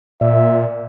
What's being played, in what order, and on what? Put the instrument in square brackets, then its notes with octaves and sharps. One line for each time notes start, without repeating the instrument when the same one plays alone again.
[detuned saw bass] A#2 [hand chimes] D5 [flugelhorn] E5